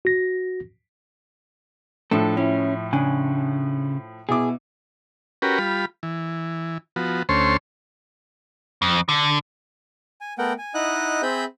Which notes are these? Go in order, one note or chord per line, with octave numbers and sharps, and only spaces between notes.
F#4 A#6
A2 F3 A3 D4 A4
C#4 E4
C#3 D4 G#5
B2 E4 G#4 D6
C#4 F#4 G4 A#4 B4
G3 F4 B5
E3
F3 B3 F#4
D2 A3 C#4 C5 C#5 C6
F2
D3
G#5
A3 B3 A#4 F#5 G5
G#5
D#4 E4 D#5 F#5 D#6 F#6
C4 G#4 C5 E5 B5 G6